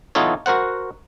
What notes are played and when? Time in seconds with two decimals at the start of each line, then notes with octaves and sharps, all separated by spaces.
0.15 E3 B3 D#4 F4 A4 C#5
0.46 F#4 A#4 C5 F#5